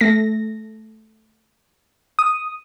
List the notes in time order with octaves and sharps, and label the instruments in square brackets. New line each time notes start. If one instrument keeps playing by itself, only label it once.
[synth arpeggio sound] A3 A#6
[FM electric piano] D#6